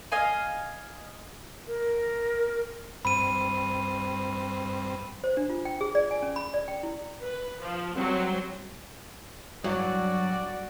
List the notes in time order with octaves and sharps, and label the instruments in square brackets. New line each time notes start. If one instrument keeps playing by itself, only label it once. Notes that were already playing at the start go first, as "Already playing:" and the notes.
[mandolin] D#5 F5 G#5
[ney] A#4
[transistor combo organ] G2 C4 [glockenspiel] B5 D#7
[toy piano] C5
D4
F4
G5
G#4
D5
G#5
C#4
B5
D5
G5
E4
[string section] B4
F3
F#3 G3 C4
[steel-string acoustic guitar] G2 [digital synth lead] F#3 [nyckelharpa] F#4 [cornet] D5